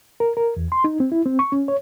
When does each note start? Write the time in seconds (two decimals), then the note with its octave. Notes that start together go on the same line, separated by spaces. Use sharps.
0.20 A#4
0.37 A#4
0.57 E2
0.72 C6
0.84 D#4
1.00 C4
1.12 E4
1.26 C4
1.39 C#6
1.52 C#4
1.68 C#5